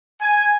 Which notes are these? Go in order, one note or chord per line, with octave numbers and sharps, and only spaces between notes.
G#5